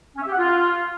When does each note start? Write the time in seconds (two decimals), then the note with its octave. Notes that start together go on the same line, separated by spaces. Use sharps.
0.16 C#4
0.21 E5
0.27 G4
0.32 F#5
0.38 F4